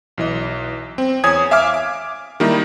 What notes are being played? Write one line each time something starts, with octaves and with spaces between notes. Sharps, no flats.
B1 E3 D#5
C4
E2 C#5 G#5 D#6 G#6
E5 F5 G#5 D6 F6
D6
D#3 G3 A#3 D#4 E4